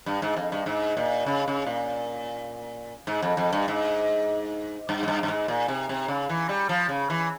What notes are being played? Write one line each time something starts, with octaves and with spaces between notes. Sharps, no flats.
G2
G#2
F2
G2
G#2
A#2
C#3
C#3
A#2
G#2
F2
F2
G2
G#2
G2
G#2
G2
G2
G#2
A#2
C3
C3
C#3
E3
G3
F3
C#3
E3